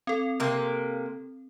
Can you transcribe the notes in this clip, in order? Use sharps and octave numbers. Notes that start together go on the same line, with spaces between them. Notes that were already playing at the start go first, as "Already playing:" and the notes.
C4 A4
C3 A#3